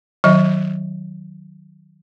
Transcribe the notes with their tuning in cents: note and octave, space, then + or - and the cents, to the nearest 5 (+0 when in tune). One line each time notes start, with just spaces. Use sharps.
D#3 +0 F#3 +0 D#5 +10